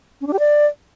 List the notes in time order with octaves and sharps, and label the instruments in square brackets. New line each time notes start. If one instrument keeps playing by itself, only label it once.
[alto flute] C#4
D4
G4
D5